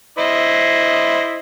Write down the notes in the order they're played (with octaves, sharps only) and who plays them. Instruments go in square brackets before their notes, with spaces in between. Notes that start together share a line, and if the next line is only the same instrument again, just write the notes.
[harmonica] E4 C5 D#5